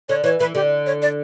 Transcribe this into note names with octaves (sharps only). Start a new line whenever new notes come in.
D3 C#5
E3 C#5
E3 B4
D3 G4
C#5
D5